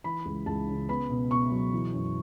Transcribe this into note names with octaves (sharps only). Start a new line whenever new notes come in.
E3 B5
C#2
C#2 A5
C#3
B3 B5
B2
B2 C#6
F#3
E3
F#2